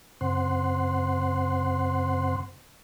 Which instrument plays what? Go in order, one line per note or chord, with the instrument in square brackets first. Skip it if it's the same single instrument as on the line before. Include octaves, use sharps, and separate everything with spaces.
[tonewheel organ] F#2 C#3 C4 C5 F#5 C6